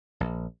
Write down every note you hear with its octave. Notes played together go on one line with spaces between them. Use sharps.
A#1